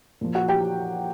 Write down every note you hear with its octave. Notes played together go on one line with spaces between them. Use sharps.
A#2 F3
F#4 F#5
G4 G5